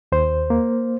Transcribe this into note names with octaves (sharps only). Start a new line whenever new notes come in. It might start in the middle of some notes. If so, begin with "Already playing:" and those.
D#2 C5
A#3